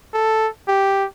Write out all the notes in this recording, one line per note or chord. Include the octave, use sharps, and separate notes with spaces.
A4
G4